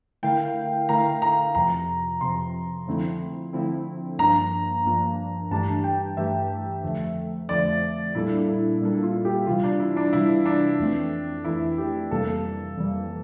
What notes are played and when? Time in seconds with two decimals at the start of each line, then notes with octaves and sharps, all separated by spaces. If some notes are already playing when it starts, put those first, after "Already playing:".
0.23 D3 A3 E4 A#4 F5 G5
0.89 D3 A3 E4 A#4 F5 A#5
1.22 A#5
1.55 F2 C3 F3 A#5
2.21 F2 C3 F3 C6
2.87 D3 F3 A3 C4 E4
3.53 D3 F3 A3 C4 E4
4.18 G2 F3 A#3 D4 A#5
4.85 G2 F3 A#3 D4
5.51 G2 E3 A3 D4 G4 A5
5.84 G5
6.17 G2 E3 A3 D4 G4 E5
6.83 F2 D3 F3 A3
7.49 F2 D3 F3 A3 D5
8.15 A#2 G3 A#3 D4 E4 A4
8.48 E4
8.81 A#2 G3 A#3 D4 A4
9.03 F4
9.25 G4
9.46 C3 E3 G3 F4
9.64 D4
9.80 E4
9.97 D4
10.13 C3 E3 G3 E4
10.46 D4
10.79 F2 E3 A3 C4
11.44 F2 E3 A3 C4 E4
11.78 G4
12.11 F2 C3 E3 G3 A#3 A4
12.77 F2 C3 E3 G3 A#3